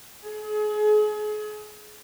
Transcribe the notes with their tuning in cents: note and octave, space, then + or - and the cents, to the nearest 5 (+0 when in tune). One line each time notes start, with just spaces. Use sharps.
G#4 +35